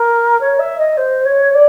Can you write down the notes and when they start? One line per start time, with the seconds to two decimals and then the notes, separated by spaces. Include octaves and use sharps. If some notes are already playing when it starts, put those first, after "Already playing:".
Already playing: A#4
0.40 C#5
0.59 E5
0.77 D#5
0.97 C5
1.25 C#5
1.53 D5